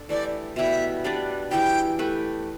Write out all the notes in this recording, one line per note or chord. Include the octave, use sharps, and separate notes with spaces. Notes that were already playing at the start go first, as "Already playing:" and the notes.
Already playing: D4 A4
E3 A3 E4 G4 D5
B2 G3 E4 G4 E5
G3 D4 B4 D5
E3 G3 E4 G4 G5
A3 G4 B4